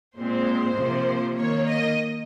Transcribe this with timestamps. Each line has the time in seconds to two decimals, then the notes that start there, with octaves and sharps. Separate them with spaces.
0.16 A#2 G#3 C4 C5
0.77 C3 F3 A#3
1.37 D#3 A#3 C#5
1.67 D#5